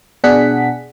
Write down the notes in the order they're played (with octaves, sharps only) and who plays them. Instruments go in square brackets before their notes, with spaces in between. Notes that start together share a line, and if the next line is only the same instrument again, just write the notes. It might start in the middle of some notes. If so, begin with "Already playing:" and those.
[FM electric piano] B2 D4 G#4 F#5 B6